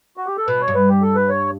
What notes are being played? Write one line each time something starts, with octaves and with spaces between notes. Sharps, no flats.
F#4
G4
A4
B2 B4
C#5
G2
B4
G4
A4
B4
C#5